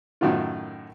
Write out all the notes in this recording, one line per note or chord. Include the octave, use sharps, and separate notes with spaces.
F#2 A2 D#3 F#3 F4